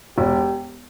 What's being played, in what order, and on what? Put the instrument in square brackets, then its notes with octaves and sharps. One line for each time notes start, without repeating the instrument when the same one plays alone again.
[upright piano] E1 [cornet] G4